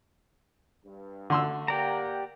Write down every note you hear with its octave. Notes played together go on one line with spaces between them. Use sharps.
G2
D3 A3 F#4 C6 E6
A#3 G4 D5 F#5 G5 A#5